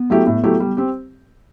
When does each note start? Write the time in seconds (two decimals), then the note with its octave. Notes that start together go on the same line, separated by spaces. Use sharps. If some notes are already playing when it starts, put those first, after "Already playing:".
Already playing: B3
0.10 F#3 A3 E4 G4
0.27 A2
0.43 F#3 A3 E4 G4
0.60 G3
0.77 C4 G4